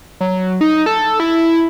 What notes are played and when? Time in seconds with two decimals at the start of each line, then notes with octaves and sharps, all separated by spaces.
0.21 F#3
0.61 D#4
0.86 A4
1.20 E4